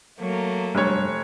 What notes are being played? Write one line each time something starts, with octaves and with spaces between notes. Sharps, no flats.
F#3 A3 A#3
F1 G2 C#5